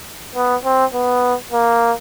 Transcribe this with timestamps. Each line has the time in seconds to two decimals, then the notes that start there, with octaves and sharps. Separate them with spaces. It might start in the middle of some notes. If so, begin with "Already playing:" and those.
0.36 B3
0.65 C4
0.94 B3
1.52 A#3